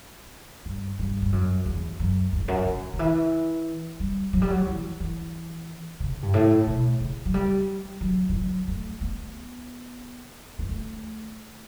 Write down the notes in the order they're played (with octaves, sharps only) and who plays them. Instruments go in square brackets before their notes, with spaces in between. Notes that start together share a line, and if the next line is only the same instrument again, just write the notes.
[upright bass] G2
G2
G2
F#2
E2
F#2
F#2
E2
F#2
D3
D3
E3
G3
F#3
G3
F#3
E3
E3
C#3
G2
A2
B2
C#3
F#3
G3
F#3
E3
F#3
A3
B3
B3
A3